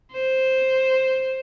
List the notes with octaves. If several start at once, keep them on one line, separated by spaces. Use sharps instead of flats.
C5